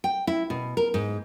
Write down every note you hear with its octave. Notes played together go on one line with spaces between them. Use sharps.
G5
E4
B2
A#4
G#2